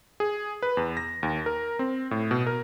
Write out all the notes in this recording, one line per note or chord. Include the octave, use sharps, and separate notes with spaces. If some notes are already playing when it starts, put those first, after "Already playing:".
G#4
B4
E2
A#6
D#2
A#4
C4
A2
B2
A#4